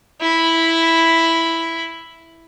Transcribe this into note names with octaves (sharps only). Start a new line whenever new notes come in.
E4 B5